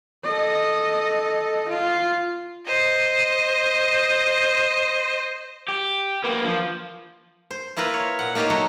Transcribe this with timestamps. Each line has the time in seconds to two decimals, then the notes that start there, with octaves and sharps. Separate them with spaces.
0.24 A4 D#5
1.69 F4
2.67 C5 D#5
5.69 G4
6.24 A#3 B3
6.44 F3
7.51 C5
7.77 A#3 E4 F4 A#4 B4
7.94 C#5
8.19 A#2 F#5
8.35 A#3 D#4 F4 G4 C#5 D#5
8.50 F#3 A3 F#4